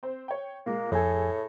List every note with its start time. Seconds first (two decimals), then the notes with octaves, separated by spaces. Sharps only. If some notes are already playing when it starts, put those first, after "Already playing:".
0.03 C4 C5
0.28 C#5 G5
0.66 A#2 G#3 A#3
0.92 F2 A2 G#4 A4 G#5